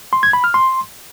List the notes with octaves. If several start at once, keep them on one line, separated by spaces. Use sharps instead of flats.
C6
G#6
B5
F6
C6